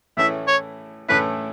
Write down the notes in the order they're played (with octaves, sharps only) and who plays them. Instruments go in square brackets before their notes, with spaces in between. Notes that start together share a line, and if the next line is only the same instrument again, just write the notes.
[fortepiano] A2 E3 A3 C#4 E4 [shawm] E5
[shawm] C#5
[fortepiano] A2 E3 A3 C#4 E4 [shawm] B4